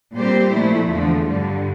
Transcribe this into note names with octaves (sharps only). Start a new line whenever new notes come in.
A#2 G3 C4 G4 C5
A#2 F3 A3 E4
E2 D3 F3 A3
G2 D3 G3